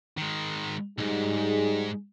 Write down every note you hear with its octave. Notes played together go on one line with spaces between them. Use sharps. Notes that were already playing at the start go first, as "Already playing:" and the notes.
D#3 G#3
B1 G#2 G3 D#4 G#4